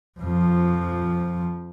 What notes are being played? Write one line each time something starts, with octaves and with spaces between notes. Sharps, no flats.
F2 F3